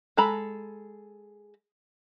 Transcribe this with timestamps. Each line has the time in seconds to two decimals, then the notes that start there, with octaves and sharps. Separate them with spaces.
0.17 G#3 A4 A#5 B5